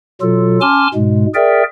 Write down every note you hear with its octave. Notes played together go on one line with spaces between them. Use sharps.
B2 F#3 F4 A4
C#4 G#5 A5 C6 D6 F6
G#2 B2 G#3
G#4 A#4 D5 E5 G5